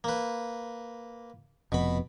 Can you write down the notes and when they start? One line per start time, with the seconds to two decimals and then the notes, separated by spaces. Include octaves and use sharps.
0.04 A#3 B4
1.72 F1 F2 B2 B3 B5